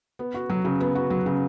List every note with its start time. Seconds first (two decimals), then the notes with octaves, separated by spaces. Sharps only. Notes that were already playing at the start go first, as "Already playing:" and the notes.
0.19 B3
0.34 F#4
0.50 F#3
0.65 C#3
0.80 B3
0.95 F#4
1.10 F#3
1.26 C#3